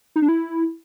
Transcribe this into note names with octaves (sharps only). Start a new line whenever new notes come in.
D#4
D4
E4